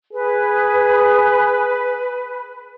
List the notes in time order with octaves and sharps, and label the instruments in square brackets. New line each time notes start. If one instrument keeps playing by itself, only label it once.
[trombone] G#4 [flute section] B4